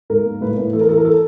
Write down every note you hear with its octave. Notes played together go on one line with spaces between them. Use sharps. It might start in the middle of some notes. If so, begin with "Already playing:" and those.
G#2 A#4
A#3
A2 B4
A2
E3 A4
A#4
E3 A4
A#4
A4